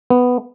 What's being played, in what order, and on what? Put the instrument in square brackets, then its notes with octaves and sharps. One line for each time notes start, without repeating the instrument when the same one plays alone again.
[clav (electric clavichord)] B3